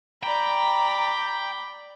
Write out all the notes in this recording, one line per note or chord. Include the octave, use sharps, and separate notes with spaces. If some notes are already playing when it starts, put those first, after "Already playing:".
D5 G5 A#5 B5